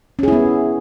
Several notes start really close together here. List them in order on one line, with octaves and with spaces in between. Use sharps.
C#4 G#4 E4 B3